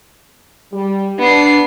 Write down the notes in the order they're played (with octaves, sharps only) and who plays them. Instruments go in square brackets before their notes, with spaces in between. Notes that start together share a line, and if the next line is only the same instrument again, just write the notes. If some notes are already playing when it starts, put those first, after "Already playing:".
[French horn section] G3
[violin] B3 C7 [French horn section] D4